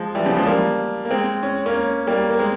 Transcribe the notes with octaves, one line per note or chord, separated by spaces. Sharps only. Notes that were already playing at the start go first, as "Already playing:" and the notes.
Already playing: F3 G#3
E3 G3
C#3 F3
F3 G#3
G3 A#3
A#3
G#3 C4
C#4
A#3 C#4
G3 A#3
A#3
G#3 C4